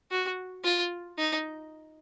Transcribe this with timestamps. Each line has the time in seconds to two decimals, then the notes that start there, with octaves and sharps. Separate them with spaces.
0.11 F#4
0.65 F4
1.18 D#4